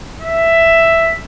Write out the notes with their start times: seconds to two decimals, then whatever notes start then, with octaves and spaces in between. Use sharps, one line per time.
0.21 E5